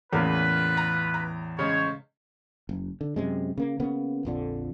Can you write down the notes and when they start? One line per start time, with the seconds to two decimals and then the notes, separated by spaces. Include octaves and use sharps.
0.13 E2 A2 C#3 A#3 F4 B4
0.77 A#5
1.14 A#5
1.59 C#3 G#3 C5 C#5
2.69 F#1
3.01 D3
3.16 F#2 C3 G#3
3.58 C#3 A#3
3.80 C#3 A#3 B3
4.25 A#1 F2 D3